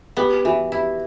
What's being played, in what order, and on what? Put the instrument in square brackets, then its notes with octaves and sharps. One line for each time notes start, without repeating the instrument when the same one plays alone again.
[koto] B3 [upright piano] G4
[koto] E3 [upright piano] F#4
[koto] E4 [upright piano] G4